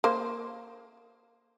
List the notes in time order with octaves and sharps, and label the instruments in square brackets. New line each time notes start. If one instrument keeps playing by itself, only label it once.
[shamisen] A#3 C5